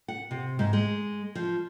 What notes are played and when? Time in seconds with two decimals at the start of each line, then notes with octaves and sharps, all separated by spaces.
0.08 F#5
0.31 C3
0.59 G#2
0.73 G#3
1.35 F3